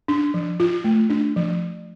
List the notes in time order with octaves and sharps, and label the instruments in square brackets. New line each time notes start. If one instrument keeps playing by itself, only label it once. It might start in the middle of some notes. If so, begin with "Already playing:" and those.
[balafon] D4
F3
F4
A3
D4
F3